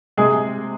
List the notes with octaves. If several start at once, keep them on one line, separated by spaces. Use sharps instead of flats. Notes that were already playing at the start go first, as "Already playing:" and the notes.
C3 G#3 G#4